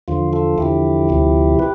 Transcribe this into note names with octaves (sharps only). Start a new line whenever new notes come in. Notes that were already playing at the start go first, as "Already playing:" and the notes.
E2 D3 F3 F4
F4 A4
E2 D3 F3 E4 G4
D2 C3 F3
G4 B4